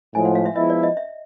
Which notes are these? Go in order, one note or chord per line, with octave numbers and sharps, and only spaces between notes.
A2 F3 G#3 G#5
F#5
F5
E5
F3 G#3 B3 E4 D#5
D5
D#5
E5